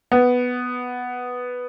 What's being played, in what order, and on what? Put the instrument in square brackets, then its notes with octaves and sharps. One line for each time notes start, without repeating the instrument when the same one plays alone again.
[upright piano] B3